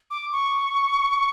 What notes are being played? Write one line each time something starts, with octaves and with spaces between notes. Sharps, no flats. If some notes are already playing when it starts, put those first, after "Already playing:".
D6
C#6